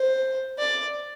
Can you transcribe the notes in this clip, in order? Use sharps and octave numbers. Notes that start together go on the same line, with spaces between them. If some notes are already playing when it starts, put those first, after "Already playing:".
Already playing: C5
D5